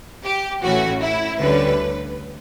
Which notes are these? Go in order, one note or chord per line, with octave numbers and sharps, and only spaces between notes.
G4
A1 A2 E3 A3 C#4 F#4
E4
D2 D3 G3 C#4 B4